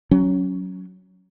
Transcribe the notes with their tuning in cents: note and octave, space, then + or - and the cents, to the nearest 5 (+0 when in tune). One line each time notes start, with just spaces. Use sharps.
F#3 +5 C#4 +0